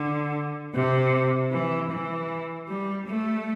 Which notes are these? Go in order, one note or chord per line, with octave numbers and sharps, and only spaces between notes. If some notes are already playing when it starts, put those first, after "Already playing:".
Already playing: D3
C3
E3
E3
G3
A3